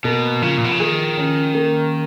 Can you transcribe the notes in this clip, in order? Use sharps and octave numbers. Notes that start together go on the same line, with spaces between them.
B2 A#3
C#3 F3
A#2
B2
C#3
D#3 G#4
C#4
A#3